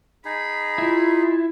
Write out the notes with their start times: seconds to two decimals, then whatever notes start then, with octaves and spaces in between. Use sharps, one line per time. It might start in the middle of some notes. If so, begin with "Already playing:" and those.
0.25 D#4 G#4 B5
0.78 E4 F4